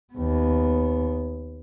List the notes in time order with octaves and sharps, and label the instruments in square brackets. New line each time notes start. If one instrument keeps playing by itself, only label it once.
[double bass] D#2 B3